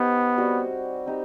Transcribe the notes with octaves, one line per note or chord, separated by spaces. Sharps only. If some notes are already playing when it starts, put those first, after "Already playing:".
Already playing: B3 D#4 G4 C5 D#5
G3 C4 F#4
C4 D#4 G4